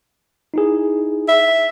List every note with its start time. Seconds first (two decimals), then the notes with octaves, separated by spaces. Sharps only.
0.54 D#4 E4 G#4
1.28 E5